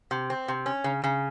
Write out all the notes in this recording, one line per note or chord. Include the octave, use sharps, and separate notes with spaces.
C3
C4
C3
C#4
C#3
C#3